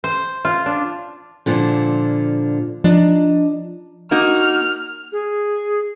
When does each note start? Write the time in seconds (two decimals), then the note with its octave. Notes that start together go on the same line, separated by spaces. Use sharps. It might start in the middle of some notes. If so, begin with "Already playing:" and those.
0.04 C5
0.45 F4
0.66 D4
1.46 A#2 D3 F3
2.84 F3 D4 D#4
4.11 A#3 D#4 F#4 F6
5.12 G#4